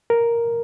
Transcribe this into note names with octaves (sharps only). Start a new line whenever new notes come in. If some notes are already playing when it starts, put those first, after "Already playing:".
A#4